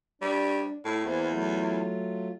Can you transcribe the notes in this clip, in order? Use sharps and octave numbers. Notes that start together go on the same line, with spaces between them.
G3 D4
A2
E2 A#3 C5
F#3 A3 F4